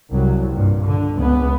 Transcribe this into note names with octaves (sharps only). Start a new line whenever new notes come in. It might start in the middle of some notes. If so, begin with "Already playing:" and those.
C2 F#3
G2 A#2
D3
C#2 B3